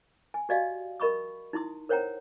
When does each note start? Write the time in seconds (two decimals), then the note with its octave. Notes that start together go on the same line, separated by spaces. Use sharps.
0.34 G#5
0.49 F#4 G4 D5 D#5 F5 G#5
1.00 A#4 D#5 B5 C#6 D#6
1.53 D#4 E4 C6 D#6
1.89 A#4 C5 C#5 F#5 G5 A#5